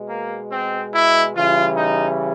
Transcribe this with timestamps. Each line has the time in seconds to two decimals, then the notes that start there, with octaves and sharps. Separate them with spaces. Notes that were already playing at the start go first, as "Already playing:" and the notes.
Already playing: B2 G#3
0.08 A#3
0.50 C4
0.93 E4
1.35 C#3 E3 G3 F4
1.77 D#4